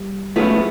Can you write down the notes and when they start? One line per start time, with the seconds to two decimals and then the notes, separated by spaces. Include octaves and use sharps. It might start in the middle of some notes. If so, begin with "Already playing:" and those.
Already playing: G3
0.36 F3 G#3 A3 B3 C#4 E4